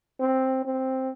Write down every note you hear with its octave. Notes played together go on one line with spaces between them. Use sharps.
C4
C4